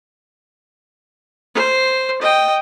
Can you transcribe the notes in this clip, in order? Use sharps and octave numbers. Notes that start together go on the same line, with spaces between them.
C5
D#5 G5